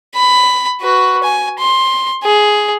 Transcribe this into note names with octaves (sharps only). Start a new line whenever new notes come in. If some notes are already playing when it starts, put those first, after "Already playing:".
B5
F#4 B4
G#5
C6
G#4